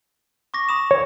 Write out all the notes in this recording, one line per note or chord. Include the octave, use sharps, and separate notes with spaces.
C#6 D6 A#6
B5 D#6 E7
C#5